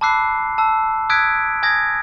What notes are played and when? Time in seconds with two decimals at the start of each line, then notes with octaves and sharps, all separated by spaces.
0.01 A5 B5 D6 E6 F#6 C7
0.58 A5 E6
1.10 D#6 E6 F#6 G#6 B6 D7
1.63 G#5 D#6 G#6 A#6